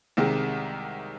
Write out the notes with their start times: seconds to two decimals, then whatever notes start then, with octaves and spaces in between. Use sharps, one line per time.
0.17 C2 C3 D#3 G#3